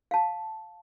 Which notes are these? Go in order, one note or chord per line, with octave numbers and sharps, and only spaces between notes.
F5 A5